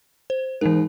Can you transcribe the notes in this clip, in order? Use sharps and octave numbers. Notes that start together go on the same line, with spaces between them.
C5
G#2 E3 A#4